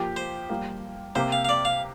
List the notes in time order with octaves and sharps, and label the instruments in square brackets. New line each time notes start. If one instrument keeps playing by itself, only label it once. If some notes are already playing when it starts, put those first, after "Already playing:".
Already playing: [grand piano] F3 A#3 G4
[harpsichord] C5
[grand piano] G3 A#3 G4
[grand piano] C3 A#3 G4 [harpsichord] C5
[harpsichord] F5
F5
D5
F5